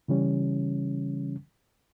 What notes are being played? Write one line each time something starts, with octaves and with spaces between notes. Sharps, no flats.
C#3 E3 G3 C#4